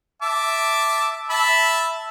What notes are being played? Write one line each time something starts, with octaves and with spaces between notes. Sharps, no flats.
E5 A5 D6
E5 A5 B5